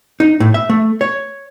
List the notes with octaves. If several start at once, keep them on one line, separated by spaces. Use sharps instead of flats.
D#4
A2
E5
A3
C#5